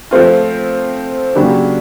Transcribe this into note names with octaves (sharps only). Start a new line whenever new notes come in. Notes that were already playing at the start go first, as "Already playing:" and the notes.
F3 A3 C4 F4
C#3 F#3 A#3 D4 G4